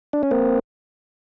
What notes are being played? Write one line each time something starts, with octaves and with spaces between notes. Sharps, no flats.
D4
C#4
A#3 C4